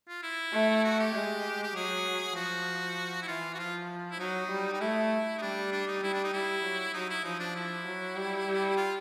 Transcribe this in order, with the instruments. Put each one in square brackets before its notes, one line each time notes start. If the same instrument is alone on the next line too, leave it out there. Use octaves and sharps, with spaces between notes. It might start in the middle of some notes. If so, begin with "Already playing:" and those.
[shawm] F4
E4
[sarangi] A3
[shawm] F#4
G4
[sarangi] G#3
[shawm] G4
[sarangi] F#3 [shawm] G#4
[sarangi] F3 [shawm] F#4
[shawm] E4
[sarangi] E3 [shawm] F4
[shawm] F#4
[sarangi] F3 [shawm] F4
[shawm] E4
[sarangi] F#3 [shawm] D#4
[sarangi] G3
[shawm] D#4
[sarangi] A3 [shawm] E4
[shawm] D#4
[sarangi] G3 [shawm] D4
[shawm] D4
D#4
[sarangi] G3 [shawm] E4
[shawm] D4
D#4
[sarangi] G3 [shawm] E4
[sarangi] F#3
[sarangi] F#3 [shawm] D#4
[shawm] E4
[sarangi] F3 [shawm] D#4
[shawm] D4
E4
[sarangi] F#3
G3
G3
[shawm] F4